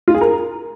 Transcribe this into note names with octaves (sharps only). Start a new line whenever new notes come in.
F4
G#4
A#4